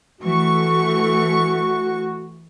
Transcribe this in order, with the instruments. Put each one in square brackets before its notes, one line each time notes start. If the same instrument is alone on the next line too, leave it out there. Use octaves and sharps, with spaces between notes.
[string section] E3 A3 C#6 [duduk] F#4